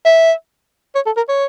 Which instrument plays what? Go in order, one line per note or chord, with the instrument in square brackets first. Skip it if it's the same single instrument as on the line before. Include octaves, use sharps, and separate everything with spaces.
[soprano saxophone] E5
C#5
A4
A#4
C#5